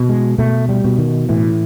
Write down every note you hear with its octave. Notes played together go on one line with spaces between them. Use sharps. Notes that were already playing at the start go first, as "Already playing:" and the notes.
Already playing: B2
G#3
B2 A3
G3
B2
D#3
A2 E3